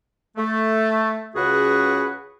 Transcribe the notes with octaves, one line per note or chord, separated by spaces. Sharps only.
A3
C#2 C#3 F#4 G#4 B4 F#5